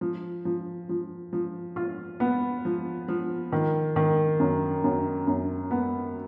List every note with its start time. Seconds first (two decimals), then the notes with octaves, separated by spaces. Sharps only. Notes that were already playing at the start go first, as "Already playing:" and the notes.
0.01 F3
0.45 F3
0.89 F3
1.33 F3
1.76 F4
2.20 B3
2.65 F3
3.08 F3
3.52 D#3
3.96 D#3
4.40 F#2
4.84 F#2
5.27 F#2
5.71 B3